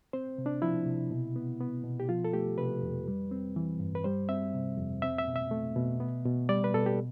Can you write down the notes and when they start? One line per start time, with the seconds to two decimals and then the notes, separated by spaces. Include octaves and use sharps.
0.13 C4 C5
0.38 C3
0.46 D4
0.62 F3 E4
0.86 C3
1.11 B2
1.36 B3
1.60 B3
1.84 B2
2.00 G4
2.09 F3 F4
2.24 A4
2.33 A3 G4
2.58 C3 B4
2.82 F2
3.08 G3
3.31 C4
3.56 E3
3.80 G2
3.95 B4
4.04 G3 C5
4.29 C4 E5
4.54 C3
4.78 F2
5.02 C4 E5
5.18 E5
5.27 B2
5.36 E5
5.51 A3
5.76 B2
6.00 B3
6.26 B2
6.49 G3 D5
6.64 B4
6.74 B2 A4
6.86 G4